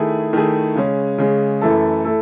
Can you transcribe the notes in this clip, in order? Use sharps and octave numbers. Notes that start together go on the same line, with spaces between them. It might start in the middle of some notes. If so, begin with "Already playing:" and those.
Already playing: D#3 A3 E4 G#4
D#3 A3 E4 G#4
C#3 G#3 C#4
C#3 G#3 C#4
F#2 E3 A3 E4 A4
A3 E4 A4